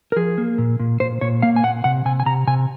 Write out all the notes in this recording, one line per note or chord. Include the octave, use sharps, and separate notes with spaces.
A#4
F3 G#4
A#3
A#2
A#2
A#2 C5
A#2 C#5
A#3 F5
G#5
A#2 F#5
C3 F#5
C3 G#5
G#5
C3 A#5
C3 G#5